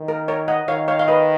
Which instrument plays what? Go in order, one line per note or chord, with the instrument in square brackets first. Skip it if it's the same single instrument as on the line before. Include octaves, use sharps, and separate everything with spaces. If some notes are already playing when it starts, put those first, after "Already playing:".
Already playing: [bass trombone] D#3
[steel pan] A#4
A#4 C#5
D#5 F#5
[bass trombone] D#3 [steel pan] C#5 F5
[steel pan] C#5 F5
F5
B4 D#5